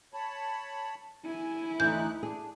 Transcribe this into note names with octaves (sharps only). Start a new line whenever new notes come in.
C#5 A5 B5
E4 G#5
D2 D3 E3 D#4 F#6 G6
D4 G#4